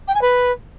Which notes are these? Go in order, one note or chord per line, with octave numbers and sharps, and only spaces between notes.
G5
G#5
B4